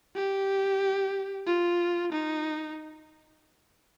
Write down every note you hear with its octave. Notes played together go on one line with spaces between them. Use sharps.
G4
F4
D#4